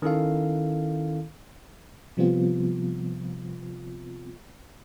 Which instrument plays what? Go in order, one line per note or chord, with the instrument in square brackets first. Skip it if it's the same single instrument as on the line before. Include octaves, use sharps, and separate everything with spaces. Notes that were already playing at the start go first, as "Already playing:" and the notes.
[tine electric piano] D#3 C#4 E4 A4 F5
[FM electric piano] C3 F3 G3 B3 C4 F4